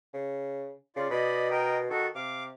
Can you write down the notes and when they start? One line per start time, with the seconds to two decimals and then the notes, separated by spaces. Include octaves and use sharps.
0.14 C#3
0.96 C#3 F4 D5
1.11 B2 D5 D#5 B5
1.51 A#4 D#5 G5
1.90 D#3 F#4 A4
2.15 C3 F5 D6